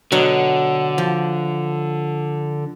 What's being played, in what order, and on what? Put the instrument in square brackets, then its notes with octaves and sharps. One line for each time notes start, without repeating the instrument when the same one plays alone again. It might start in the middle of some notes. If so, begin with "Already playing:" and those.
[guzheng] B2 F#3 F#5 [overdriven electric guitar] D3
[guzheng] F3